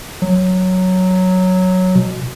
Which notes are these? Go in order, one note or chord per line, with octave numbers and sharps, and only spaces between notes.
F#3
B2